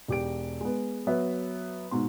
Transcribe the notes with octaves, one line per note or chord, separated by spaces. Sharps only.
E1 G4 D7
G#3 B3
F#3 B3 E5
G#2 B2 C6